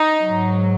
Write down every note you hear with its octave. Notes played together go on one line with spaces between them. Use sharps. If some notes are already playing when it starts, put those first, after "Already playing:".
Already playing: D#4
G#2 F#3